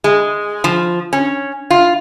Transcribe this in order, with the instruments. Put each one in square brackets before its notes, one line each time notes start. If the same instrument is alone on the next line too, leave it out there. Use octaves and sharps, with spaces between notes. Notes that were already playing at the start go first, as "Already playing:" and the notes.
[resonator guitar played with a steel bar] G#3
F3
C#4
F4